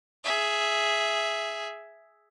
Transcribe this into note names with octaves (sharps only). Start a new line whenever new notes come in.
G#4 E5